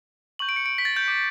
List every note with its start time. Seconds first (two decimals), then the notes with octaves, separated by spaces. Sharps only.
0.39 C#6 G6 F#7
0.49 D7
0.56 C#7
0.66 D7
0.78 B6
0.85 A6
0.96 G6
1.08 D6 G6